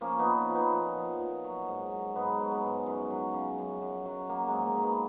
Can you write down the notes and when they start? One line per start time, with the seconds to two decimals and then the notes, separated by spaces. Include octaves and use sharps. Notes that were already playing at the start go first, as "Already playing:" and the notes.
0.01 F3 A#3 C#4
0.19 B3 D#4
0.25 A#2
0.37 C#4 F4
0.49 F3
0.55 B3 D#4
0.73 A#2
0.97 F3
1.20 A#2
1.44 F#3
1.68 G#2
1.92 F#3
2.15 G#2 B3 D#4
2.39 F#3
2.51 G#3 B3
2.63 G#2
2.86 F#2
3.11 F#3
3.34 C#3
3.58 F#2
3.82 F#2
4.06 F#3
4.29 F#3 A#3
4.48 G#3
4.54 G#2
4.66 A#3
4.77 F#3
4.83 G#3 B3